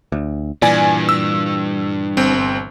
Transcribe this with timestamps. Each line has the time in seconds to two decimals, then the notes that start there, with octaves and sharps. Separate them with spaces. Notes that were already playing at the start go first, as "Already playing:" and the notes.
0.12 D2
0.62 E2 G2 A#2 E3 D5 G#5
1.09 E6
2.17 G1 C4